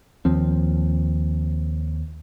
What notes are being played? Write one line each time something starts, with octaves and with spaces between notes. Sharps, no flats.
D#2 F3 C4